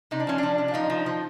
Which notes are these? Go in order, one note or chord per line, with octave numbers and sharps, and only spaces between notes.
C3 D#4
D4
F3 C#4
F3 D4
C3
D4
F3 D#4
F3
F3